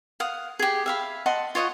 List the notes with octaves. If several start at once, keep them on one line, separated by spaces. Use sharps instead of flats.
F5 F#5 D#6
G4 G#4
E5 F5 B5
D#5 F#5 A5 C6
F4 C#5 D#5 F#5